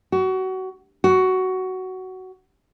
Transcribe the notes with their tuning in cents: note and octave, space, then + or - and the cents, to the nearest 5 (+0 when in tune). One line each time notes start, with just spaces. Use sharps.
F#4 +25
F#4 +10